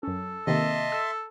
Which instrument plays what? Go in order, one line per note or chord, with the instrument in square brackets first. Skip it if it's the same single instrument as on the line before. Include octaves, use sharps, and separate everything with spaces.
[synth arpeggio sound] F#2 C#4 [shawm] A4
[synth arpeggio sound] C3 D#3 A#3 [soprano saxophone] D#5 [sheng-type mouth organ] E5 A5 C6
[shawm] A4 [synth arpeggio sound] E6